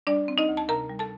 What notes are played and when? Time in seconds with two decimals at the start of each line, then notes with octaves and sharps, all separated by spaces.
0.07 G3 D4 D5
0.28 C4
0.38 D#4 D#5
0.49 D2
0.57 A5
0.69 C3 A#4 A#5
0.89 G3
0.99 A4 A5